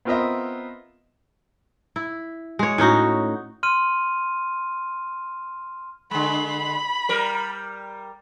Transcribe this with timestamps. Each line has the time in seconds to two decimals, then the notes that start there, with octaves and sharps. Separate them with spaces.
0.05 B3 C4 F4 A#4 D#5 E5
1.96 E4
2.59 G#3 C#5
2.78 A2 C#4 D#4 F#4
3.63 C6 F6 D#7
6.11 D3 G#3 B5
7.09 G3 A#4